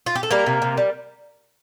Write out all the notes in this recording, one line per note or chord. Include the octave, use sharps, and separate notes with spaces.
F4
G4
A4
G3 A#3 A#4
C3
C3
G3